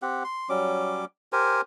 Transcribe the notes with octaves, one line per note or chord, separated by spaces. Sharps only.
C4 G4 F#5
C6
F#3 G3 C#4 D6
G4 A#4 C5 G#5